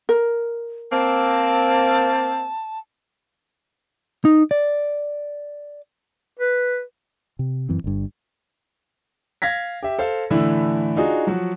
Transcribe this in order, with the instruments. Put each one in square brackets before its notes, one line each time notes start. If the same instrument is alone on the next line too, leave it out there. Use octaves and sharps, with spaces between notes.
[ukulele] A#4
[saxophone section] A#3 C4 [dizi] A5
[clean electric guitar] D#4
D5
[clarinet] B4
[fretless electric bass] C3
F#2 E3 C4
G1 G2
[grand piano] F5 G#6 A#6 B6
G4 E5
A4 C5 F5
A2 D3 E3 A3 E4
D4 D#4 F4 F#4 G#4
F3 F#3 F#4